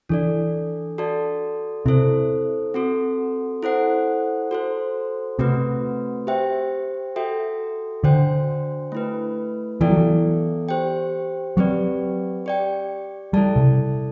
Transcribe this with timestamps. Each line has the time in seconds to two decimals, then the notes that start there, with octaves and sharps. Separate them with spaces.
0.09 E3 D4 A4 D5
0.98 F#4 A4 D5 A5
1.86 C3 E4 A4 C5
2.74 C4 F#4 A4
3.63 E4 A4 C5 F#5
4.51 F#4 A4 C5
5.39 C3 A3 C4 F#4 B4
6.27 G4 C5 E5 G5
7.16 F#4 A4 E5 G5
8.04 D3 D4 F#4 C5 G5
8.92 A3 E4 B4
9.81 E3 B3 E4 A4 D5 G5
9.90 F#3
9.97 E3
10.69 G4 C5 G5
11.57 F#3 C4 G4 B4 D5
12.46 G4 D5 G5
13.33 G3 E4 A4 D5 A5
13.56 C3